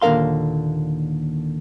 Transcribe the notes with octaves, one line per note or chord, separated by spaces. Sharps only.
D#2 A#2 D3 A#4 F5 C6